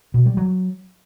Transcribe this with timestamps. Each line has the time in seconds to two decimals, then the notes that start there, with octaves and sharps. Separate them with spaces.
0.14 B2
0.26 G3
0.37 F#3